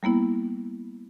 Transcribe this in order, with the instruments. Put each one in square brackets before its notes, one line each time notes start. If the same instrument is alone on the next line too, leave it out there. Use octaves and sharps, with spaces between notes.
[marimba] G3 A#3 B3 E4